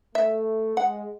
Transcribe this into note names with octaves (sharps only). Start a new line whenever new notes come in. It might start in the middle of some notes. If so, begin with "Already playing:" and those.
A3 E5
G#3 F#5